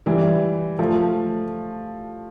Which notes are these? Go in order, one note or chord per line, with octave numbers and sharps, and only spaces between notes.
E3 G3
F3 A3